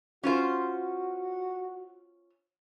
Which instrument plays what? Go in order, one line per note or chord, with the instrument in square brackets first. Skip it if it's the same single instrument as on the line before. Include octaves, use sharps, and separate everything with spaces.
[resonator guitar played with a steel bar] C#4 F4 C5 [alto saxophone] F#4